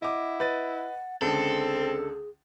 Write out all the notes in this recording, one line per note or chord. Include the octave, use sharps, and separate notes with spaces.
E4 D#5 F#5 D6
B4 D#5 A6
C#2 D3 C4 G#4 A4